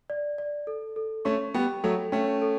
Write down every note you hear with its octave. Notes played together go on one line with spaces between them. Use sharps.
D5
D5
A4
A4
A3 C#4 C#6
G3 B3 G5
F#3 A3 A4
A3 C#4 G5
A4